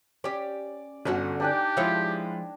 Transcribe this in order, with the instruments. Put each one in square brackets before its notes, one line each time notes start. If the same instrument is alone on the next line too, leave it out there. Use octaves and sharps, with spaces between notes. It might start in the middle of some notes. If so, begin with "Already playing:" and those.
[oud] C#4 G4 [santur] D5
[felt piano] G1 [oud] D3 C#4 F#4
[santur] D4 D#4 G5 [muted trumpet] G4 [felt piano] D5 G#5 F#6
[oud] F3 G#3 C#5 [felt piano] E4 F4